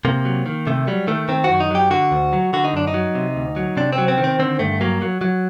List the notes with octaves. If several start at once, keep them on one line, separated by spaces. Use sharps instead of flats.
C3 A#3
F#3
D#3
C3 A3
F#3 G3
D#3 A3
D#3 C4
F#4
F#2
D#4
F#3 G4
D3 F#4
D2
F#3
D3 F#4
D#4
F#2 D4
D#4
F#3
C3
D2
F#3
C3 D4
C4
F#3
C4
D#3
C4
D3 C4
G2 A3
F#3 A#3
F#3
F#3